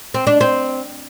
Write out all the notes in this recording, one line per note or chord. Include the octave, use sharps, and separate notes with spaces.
C4
D4
C4